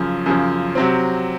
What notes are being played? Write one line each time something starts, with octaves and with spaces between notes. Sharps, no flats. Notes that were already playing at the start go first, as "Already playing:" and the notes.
Already playing: F#2 C#3 F3
F#2 C#3 F3
C3 F#3 C4